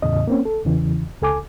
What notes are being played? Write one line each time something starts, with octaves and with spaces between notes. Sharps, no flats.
E2 A2 C#3 D#5
A#3 C4 C#4
A4
E2 C#3 E3
C#2 A4 G#5 D6